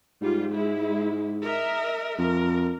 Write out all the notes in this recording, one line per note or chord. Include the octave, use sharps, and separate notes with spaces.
G#2 G3 F4
G#3 E4
A#4 D#5 E5
F2 A#4